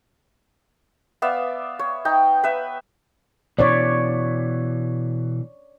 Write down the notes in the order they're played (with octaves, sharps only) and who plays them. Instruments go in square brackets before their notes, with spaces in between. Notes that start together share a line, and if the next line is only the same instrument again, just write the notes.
[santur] B3 D5 E5 F5
C#5
D#4 G5
B4 E5
[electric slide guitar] B2 E3 [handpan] C#5 D5